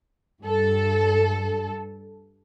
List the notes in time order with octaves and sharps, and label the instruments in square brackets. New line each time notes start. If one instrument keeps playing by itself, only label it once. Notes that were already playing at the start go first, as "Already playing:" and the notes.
[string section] G2 A4